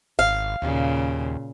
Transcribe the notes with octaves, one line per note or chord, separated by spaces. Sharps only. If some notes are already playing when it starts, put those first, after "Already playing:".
G#1 F5
D#2 A#2 C#3